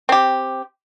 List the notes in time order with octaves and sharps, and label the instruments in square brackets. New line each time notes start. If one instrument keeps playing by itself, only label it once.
[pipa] C4 G4